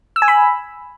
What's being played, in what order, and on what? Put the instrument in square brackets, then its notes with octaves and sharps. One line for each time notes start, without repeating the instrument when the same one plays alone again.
[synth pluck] E6
G#5
B5